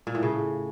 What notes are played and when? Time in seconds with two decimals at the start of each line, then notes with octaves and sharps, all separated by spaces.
0.07 A#2
0.15 A2
0.23 C#3